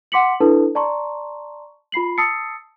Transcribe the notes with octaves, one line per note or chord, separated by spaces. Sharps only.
F#5 C6 D6 B6 C#7 F#7
D4 E4 A4 B4 A5
D5 A5 A#5 C6 C#6
F4 B5 C7 F#7
A5 D#6 E6 A6 C7 C#7